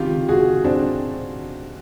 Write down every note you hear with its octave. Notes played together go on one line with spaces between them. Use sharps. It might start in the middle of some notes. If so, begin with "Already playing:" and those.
Already playing: C#2 C3 D#3 F4 G4
F#4 G#4
C4 D4